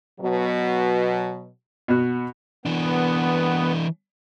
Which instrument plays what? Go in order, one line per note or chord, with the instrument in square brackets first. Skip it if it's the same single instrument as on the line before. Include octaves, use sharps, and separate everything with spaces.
[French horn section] B2 F#3
[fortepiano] B2 F#4
[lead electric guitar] E3 D4 [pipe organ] B3